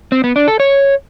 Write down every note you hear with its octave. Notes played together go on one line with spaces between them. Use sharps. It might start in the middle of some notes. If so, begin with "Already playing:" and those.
C4
B3
D4
A4
C#5